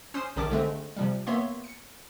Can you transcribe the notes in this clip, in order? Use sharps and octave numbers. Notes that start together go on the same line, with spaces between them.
C#4 C5 C6 D#6 C7 E7
B1 C3 D#3 C#4 A5 D6
D3 G#3 A3 C4
C3 F3 G3
A#3 B3 C#5 E5 C6
C#7